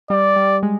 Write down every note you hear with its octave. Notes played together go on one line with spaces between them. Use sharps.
G3 D5
G3
G#3